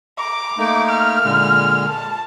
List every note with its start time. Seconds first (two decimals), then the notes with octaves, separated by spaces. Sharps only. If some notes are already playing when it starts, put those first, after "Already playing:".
0.19 A#5 D6
0.58 A3 A#3 D#4
0.90 F6
1.25 A#2 D3 G#3
1.90 A5